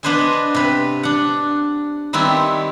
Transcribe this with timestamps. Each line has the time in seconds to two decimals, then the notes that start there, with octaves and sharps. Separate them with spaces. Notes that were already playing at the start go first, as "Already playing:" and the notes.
0.03 B3 D4 B4 C5 D#5 G#5
0.55 C3 B4
1.03 D4 F#5
2.13 D#3 G3 B3 C4 E4